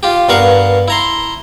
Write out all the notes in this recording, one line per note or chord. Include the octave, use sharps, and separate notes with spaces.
F4 G4
G2 B3 A#4 F5 C#6
E4 A#5 C6